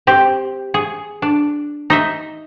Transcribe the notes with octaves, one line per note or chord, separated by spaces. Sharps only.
C4 G4
G#4
D4
D#4 D#5 E5